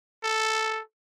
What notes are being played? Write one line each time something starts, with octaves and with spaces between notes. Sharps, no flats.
A4